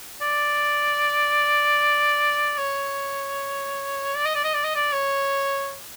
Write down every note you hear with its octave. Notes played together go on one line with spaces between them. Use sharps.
D5
C#5
D5
D#5
D5
D#5
D5
D#5
D5
C#5